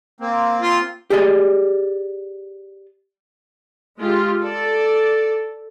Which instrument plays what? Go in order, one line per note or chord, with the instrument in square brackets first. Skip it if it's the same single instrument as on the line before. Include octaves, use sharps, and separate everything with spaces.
[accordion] A#3 C4
[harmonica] F4
[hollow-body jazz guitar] G4 G#4 D5 D#5
[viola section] G#3 F4 G4
A4 D5